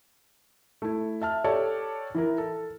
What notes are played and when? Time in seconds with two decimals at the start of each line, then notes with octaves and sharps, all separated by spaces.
0.82 A3 E4
1.22 E5 A5 F6
1.44 G4 A4 C#5 D5 A5
2.15 E3 E4 A#4
2.38 A4